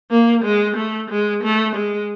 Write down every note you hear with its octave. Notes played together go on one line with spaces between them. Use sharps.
A#3
G#3
A3
G#3
A3
G#3